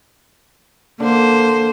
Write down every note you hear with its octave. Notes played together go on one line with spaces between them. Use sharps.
D3 A#3 C5